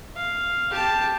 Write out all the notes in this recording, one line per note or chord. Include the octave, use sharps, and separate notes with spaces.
F5
G4 A5